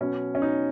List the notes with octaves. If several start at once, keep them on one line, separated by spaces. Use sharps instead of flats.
B2 F#3 B3 C#4
C#4
D#4